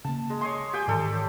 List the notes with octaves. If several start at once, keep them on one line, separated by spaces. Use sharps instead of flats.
C#3 A#3 A5
G#3
C#5 D#5 C6
G4 G5 G#5
G#2 D#3 E3 A4 D5
C#5